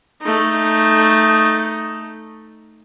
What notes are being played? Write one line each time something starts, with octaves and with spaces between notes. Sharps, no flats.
A3 D#4